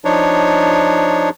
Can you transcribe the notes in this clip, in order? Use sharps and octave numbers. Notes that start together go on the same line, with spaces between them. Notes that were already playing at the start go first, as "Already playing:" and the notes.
F3 D4 D#4 C#5